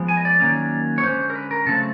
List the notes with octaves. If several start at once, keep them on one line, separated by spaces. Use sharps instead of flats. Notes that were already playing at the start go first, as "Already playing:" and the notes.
Already playing: F3 G#3 B3
G#5
D#5
D5
D#3 F#3 A#3 C#4
C#5
D3 F3 G#3 C#4 C5
A#4
B4
A#4
C#3 F#3 A3 C4 A4